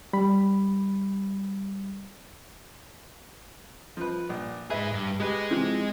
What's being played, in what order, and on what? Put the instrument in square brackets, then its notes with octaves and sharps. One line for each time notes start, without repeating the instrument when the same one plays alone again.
[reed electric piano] G3 B5
[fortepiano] F3 B4
A#1
[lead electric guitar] G#2 G#4 [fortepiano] B4 E5
[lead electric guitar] G2
[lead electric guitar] G#3 G#4 [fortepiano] G4 B4
[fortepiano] C3 E3 F3